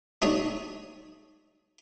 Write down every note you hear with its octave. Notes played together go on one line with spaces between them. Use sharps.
D4 D#4 G#4 C#5